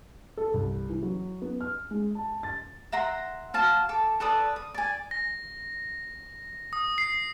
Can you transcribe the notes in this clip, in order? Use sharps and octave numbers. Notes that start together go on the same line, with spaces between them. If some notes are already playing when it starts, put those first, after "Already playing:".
A4
C2
E3
F#3
B3
F6
G#3
A5
A6
E5 F#5 A#5 C6
F#4 F5 A5
A4 D6
A4 B4 D5 D#6
D#6
D5 G#5
A#6
D#6
C7